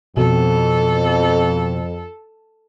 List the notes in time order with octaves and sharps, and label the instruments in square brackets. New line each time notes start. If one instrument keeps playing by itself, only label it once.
[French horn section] F2 [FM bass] B2 [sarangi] A4